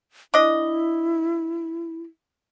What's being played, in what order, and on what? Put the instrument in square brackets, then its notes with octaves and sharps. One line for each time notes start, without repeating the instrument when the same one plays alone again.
[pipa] D4 D#5 [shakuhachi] E4